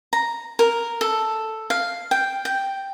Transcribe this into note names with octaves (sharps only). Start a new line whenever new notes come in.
A#5
A#4
A4
F5
G5
G5